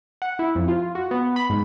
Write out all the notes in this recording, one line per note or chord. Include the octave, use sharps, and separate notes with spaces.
F#5
E4
F2
F4
F#4
B3
B5
G#2